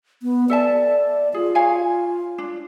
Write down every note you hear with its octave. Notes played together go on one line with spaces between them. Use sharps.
B3
A4 D5 E5 A5
F4 G#4
C#5 F5 G#5
D4